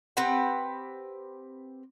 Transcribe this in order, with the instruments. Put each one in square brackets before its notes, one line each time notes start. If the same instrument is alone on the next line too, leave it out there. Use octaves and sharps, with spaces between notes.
[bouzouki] C4 G4 B4 F#5